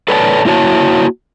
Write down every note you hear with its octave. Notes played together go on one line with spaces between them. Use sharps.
A4 B4 C#5 D5 F#5 A5
A#3 E4 F#4 C#5 A5